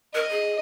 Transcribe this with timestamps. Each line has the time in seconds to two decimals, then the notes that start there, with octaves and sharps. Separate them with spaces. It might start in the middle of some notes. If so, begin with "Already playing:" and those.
0.14 A#4 D#5
0.30 G#4